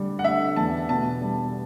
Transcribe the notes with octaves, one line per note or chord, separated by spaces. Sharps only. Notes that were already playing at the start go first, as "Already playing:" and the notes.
Already playing: D3 G3
F#5
D4 E5
E2 A5
B2 A5
G3